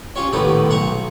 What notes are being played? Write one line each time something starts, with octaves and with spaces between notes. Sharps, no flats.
C#4 F4 G4 C#5
A#1 A2 D#3 B3 G4 D#6
B1 F#5 A#5 C#6